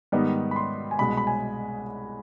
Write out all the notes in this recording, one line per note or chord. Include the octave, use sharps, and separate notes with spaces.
G#2 D#3 G3 B3 D#4
B5
C6
G#5
C2 B2 G#3 B5
B5
G#5